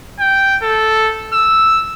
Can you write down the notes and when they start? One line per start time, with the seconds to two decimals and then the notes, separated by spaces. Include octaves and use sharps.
0.20 G5
0.63 A4
1.33 E6